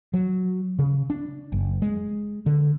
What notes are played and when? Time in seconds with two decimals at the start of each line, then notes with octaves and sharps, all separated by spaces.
0.14 F#3
0.79 C#3
1.10 D4
1.52 F#1
1.82 G#3
2.46 D3